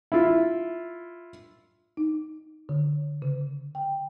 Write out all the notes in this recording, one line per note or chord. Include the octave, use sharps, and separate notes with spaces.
E4 F4
D#4
D3
C#3
G5